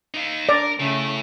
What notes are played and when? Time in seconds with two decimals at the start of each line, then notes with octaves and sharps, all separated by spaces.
0.14 D#4 F5
0.49 D4 A#4 D5
0.80 A2 C#3 A3